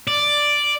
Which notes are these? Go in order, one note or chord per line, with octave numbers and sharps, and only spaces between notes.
D5